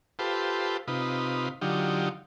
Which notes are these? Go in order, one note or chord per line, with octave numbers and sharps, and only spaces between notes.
F4 G4 A4 B4 C5
C3 D#4 F4 B4
D3 F#3 D#4 F4 G4